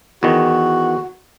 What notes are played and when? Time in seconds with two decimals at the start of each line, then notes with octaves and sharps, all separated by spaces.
0.23 E2 D#3 F#4